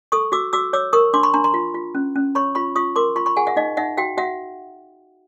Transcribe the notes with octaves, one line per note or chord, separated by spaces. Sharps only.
A4 C#6 D#6
F#4 D6 E6
F#4 D6 E6
C#5 D6 E6
A#4 C#6 D#6
D4 C6 D6
B5 C#6
D4 A#5 C6
A#5 C6
F4
F4
C#4
C#4
C#5 B5 C#6
F4 B5 C#6
F4 C#6 D#6
A#4 C6 D6
F4 B5 C#6
B5 C#6
G#4 F#5 G#5
E5 F#5
D#4 D#5 F5
D#4 E5 F#5
F#4 F5 G5
F#4 E5 F#5